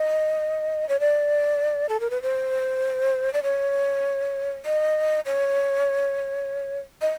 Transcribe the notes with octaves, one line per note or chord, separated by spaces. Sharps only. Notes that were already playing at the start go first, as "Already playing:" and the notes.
Already playing: D#5
C#5
D5
A4
A#4
B4
C5
D5
C#5
D#5
C#5
D#5